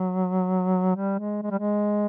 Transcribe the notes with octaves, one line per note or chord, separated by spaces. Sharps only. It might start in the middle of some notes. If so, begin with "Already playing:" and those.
Already playing: F#3
G3
G#3
G#3
G3
G#3